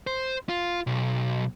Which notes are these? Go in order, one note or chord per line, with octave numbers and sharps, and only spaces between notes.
C5
F4
B1